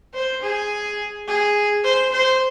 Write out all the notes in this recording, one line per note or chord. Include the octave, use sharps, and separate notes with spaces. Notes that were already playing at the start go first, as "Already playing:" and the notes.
C5
G#4
G#4
C5
C5